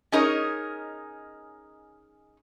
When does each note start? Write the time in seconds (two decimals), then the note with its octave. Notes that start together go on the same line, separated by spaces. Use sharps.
0.12 C#4 D#4 G#4 A#4 C#5 D#5